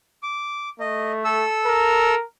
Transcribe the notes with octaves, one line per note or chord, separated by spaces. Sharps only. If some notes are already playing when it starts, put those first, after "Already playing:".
D6
A3 D#5
A4 E6
A#4